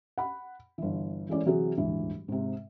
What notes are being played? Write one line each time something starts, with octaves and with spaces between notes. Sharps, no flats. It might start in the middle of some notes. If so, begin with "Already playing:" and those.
F#5 B5
G1 E3
E3 G#3 A3 C#4 E4 D5
C3 E3 F#3 F#4 G#4
D#1 D2 G#2 E3
G#2 C3